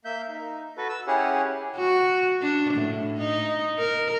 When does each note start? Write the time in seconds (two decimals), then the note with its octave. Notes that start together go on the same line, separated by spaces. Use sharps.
0.05 A#3 E5 G6
0.28 D#4
0.77 F#4 A4 B4
0.89 E6
1.07 C#4 E4 G4 G#4 C#5 F#5
1.77 F#4
2.42 D4
2.74 A2
3.20 D#4
3.79 A#4